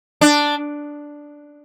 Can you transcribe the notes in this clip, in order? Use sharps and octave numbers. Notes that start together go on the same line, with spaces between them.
D4